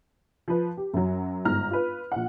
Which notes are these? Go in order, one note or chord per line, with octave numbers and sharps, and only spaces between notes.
F3 B4
G4
F#2 F#3
G1 G#2 A#5 F6
F4 B4
A#1 F#5